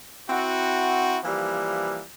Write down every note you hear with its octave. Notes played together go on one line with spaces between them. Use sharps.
C4 E4 F#4
E3 F3 G3 A#3